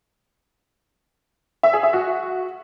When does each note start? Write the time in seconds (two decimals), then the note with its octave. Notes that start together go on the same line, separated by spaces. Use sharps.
1.63 E5
1.73 G#4
1.83 E5
1.93 F#4